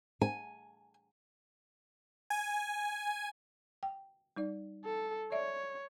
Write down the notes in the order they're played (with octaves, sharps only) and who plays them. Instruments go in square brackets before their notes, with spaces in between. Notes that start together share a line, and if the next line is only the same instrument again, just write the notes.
[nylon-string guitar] G#5
[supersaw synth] G#5
[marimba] G5
G3 D#4 D5
[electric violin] A4
[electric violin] C#5 [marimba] D5 E5